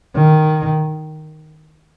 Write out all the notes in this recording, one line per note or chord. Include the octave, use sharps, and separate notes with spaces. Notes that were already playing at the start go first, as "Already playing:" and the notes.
D#3